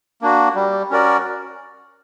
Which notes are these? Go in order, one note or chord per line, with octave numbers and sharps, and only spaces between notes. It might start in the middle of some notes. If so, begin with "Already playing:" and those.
A#3 D4 F#4
G3
C#4 F#4 A#4 D5